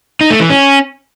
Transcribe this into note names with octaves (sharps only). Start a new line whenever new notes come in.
D#4
A3
E3
C#4